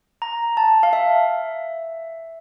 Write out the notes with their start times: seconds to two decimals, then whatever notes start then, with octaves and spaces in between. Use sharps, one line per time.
0.22 A#5
0.57 A5
0.83 F5
0.93 E5